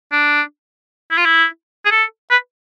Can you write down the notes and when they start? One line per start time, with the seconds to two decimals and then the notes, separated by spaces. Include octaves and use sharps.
0.12 D4
1.11 E4
1.18 F4
1.26 E4
1.86 G#4
1.91 A4
2.31 B4